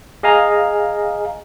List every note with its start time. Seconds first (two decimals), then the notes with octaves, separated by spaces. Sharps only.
0.23 G#4 D#5 F5 G#5 A#5